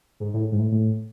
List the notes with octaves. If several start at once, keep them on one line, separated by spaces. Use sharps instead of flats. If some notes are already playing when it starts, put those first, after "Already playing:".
G#2
A2
G#2
A2
A2